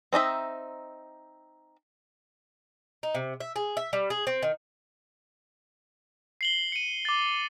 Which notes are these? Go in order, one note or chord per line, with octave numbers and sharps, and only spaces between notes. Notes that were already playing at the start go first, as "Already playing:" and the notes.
C4 D#4 D#5 E5
D#4
C3
E5
G#4
E5
G3
G#4
C4
D#3
C7 F#7 G7
C#7 D#7
D6 A6